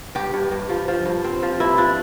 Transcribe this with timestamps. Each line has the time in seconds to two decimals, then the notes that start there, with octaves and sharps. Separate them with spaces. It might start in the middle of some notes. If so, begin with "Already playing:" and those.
0.15 G2 G4
0.34 G2
0.51 G2
0.69 F3
0.88 F3
1.05 G2
1.24 C4
1.43 F3
1.60 G2 E4
1.78 F3 D4